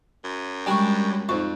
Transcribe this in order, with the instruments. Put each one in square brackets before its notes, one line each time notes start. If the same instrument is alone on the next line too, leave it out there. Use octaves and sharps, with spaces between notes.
[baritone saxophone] F#2
[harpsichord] G3 D4 [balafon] G#3 G#5 [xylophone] G5 C#6
[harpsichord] F2 [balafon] D#4 C5 C#6